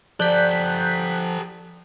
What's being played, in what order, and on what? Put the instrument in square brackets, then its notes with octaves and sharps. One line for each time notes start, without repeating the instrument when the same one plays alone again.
[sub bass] F3 [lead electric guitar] G4 A4 [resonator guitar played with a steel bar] D5 [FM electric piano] F#6 G6 B6